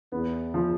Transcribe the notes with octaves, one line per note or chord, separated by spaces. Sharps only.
E2 B3
F3